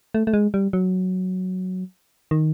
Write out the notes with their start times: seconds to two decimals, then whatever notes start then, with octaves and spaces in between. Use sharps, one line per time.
0.14 A3
0.27 A3
0.34 G#3
0.54 G3
0.73 F#3
2.31 D#3